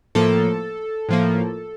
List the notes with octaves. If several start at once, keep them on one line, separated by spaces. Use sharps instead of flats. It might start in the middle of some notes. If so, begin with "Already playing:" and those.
A2 F3 A#3 A4
A2 F3 A#3